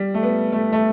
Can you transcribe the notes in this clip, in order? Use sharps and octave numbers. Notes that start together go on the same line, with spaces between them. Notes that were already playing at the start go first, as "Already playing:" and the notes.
Already playing: G3
A3
B3
A3
A3